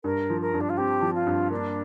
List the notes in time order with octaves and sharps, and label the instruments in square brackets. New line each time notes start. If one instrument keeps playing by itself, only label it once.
[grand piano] G2 [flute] A#4
[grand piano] F3
[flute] A#4
[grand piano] G2
[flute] D4
F4
[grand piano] C4 [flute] G4
[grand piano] F3
[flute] F4
[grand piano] G2
[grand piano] A#3 [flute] D4